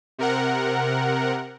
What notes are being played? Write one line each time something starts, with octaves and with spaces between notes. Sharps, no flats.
C3 A#4 F#5